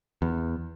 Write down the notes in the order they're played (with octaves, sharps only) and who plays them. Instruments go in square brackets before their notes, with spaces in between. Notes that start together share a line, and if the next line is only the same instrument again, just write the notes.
[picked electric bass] E2